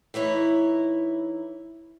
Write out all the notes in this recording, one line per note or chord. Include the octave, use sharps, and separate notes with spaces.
E3 D#4 E4 C#5